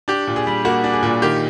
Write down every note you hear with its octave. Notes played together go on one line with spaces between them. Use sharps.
D4 G4
A#2
G#4
G3
A#3 F#4
D4
G#4
A#2
D#3 G4